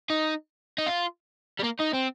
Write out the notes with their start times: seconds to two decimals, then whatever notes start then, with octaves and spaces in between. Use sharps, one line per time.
0.10 D#4
0.78 D#4
0.87 F4
1.60 G3
1.64 A#3
1.80 D#4
1.94 C4